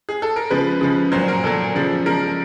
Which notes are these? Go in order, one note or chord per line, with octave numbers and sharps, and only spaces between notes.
G#4
A4
A#4
C#3 F3 G#3 B4
C#3 F3 G#3
A#2 F#3 C5
A#4
A#2 F#3 A4
C#3 F3 G#3
C#3 F3 G#3 A#4